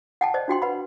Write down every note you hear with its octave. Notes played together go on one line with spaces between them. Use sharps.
F#5 G5 A5
C5 D5 D#5
D4 F#4 G5 C6
B4 F#5 B5